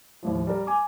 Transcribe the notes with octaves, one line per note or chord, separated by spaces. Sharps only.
D#2 A2 F3
G3 A#4
G#5 D6